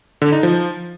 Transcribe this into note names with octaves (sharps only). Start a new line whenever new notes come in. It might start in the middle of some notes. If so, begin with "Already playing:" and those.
D3
D#4
F3